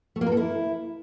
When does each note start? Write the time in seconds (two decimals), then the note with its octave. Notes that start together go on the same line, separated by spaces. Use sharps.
0.16 A3
0.21 A#3
0.26 A#4
0.32 A4
0.37 E4